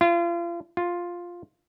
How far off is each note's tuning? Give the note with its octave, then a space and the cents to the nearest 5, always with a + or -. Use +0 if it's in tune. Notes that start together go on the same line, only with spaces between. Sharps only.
F4 -35
F4 +5